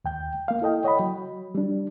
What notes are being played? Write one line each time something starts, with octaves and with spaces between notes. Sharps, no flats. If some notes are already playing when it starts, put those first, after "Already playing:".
D#2 G5 G6
A#3 F5
E4 A4 D#5 G5
C#5 D#5 F#5 G5 B5
F#3
G3 D4